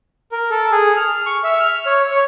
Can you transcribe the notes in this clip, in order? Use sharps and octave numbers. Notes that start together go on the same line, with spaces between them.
A#4
A4
G#4
F6
C#6
E5
F6
C#5
C#5